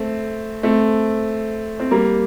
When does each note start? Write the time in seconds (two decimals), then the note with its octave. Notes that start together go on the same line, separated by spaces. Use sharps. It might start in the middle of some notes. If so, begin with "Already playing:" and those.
Already playing: A3 C4
0.63 A3 C4
1.79 C4
1.91 G3 A#3